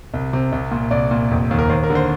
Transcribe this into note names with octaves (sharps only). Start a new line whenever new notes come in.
C2
C3
C2
A#2
C2 D5
A#2
F1
D#2
A#4
D#2 C5
A#4
D3
C5